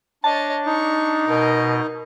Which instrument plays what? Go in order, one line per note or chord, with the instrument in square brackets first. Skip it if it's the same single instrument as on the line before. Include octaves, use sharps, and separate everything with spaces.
[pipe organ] D4 [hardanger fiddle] C#5 D#5 [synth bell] A5
[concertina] D#4 [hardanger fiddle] C#6
[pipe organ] B2 [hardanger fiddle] A#4 D#5